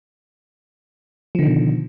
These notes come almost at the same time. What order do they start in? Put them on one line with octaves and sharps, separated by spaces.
F3 D3 D#3 B2